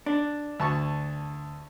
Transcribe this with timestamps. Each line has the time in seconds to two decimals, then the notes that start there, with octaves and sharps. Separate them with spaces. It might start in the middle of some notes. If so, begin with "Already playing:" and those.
0.06 D4
0.60 D2 A5 C#6